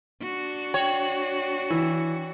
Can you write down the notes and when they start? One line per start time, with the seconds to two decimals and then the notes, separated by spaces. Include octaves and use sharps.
0.22 D4 F#4
0.74 C#5 G5 F#7
1.70 E3